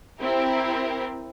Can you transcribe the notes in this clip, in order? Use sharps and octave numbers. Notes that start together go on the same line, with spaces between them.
C4 E4 G4 A#4